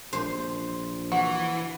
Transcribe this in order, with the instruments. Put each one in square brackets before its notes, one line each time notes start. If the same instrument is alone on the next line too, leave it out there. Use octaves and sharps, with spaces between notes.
[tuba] A#1 [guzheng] C5
[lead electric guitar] E3 [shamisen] F#4